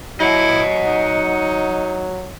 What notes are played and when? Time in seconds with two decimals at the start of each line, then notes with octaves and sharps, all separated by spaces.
0.20 F#3 E4 D#5 F#5
0.85 D#4